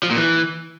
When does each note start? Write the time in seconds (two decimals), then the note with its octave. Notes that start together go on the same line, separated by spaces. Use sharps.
0.03 F3
0.10 A#2
0.16 E3